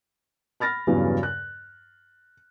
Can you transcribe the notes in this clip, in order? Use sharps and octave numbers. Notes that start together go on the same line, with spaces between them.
B5 F6 A6 A#6
E2 G2 C#3 E3 F#3
F#6